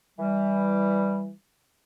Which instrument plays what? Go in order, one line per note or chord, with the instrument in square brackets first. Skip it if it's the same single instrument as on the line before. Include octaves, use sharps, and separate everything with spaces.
[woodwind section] E3 G3